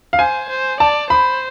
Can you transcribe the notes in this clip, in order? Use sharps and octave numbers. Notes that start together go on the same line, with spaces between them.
F5
C5 G#5
C5
D5 A5
C5 B5